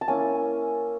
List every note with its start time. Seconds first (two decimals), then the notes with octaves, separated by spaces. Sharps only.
0.01 A5
0.08 A#3 C#4 E4 G#5